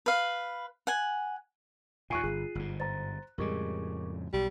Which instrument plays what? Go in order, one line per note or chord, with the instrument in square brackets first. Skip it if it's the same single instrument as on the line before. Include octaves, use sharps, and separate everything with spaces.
[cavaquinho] B4 F5
F#5 G#5
[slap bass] D#2 A#2 [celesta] F4 C7 D#7 [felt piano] G#5 C#6 F#6
[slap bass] G1 [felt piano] G#4
[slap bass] G1 G#2
[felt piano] C5 A#5 [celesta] A6
[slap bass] F2 A2 C#3 [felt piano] G3 G#3 [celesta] A#4 C#6 D6
[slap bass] B1 [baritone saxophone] G3